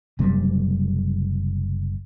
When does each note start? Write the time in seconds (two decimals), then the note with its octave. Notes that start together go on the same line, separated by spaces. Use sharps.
0.19 F#1 C3 F#3 G3